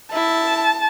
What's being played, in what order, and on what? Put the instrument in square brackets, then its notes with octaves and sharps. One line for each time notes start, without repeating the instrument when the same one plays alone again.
[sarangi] E4 [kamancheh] A5